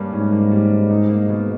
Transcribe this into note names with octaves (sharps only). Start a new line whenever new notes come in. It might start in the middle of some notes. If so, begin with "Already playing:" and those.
Already playing: G2 G3 A#3 C#4
G#2 C#4
A#3
G3
G2
D#4
A#3
B2